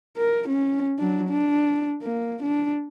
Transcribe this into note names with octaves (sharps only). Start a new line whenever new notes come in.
A#4
C#4
F#3 D4
D4
A#3
D4